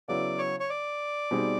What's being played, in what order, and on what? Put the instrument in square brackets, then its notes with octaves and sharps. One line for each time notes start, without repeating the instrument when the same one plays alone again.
[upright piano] C#3 F#3 B3 E4 [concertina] D5
[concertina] C#5
C#5
D5
[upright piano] B2 G3 C4 D#4 G#4